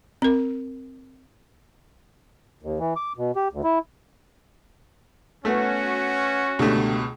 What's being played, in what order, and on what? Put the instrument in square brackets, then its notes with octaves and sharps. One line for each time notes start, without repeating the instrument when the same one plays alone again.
[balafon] C4 A#4
[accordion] D#2
E3
D6
B2
G4
D2
E4
[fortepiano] A3 B3 F#5 [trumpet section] C#4 F#4
[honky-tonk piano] C#2 B2 [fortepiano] D3 G3 A3